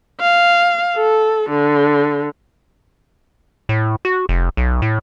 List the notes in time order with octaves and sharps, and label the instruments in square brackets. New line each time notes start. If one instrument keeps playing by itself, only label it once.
[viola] F5
A4
D3
[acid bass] A2
F#4
F1
B1
A2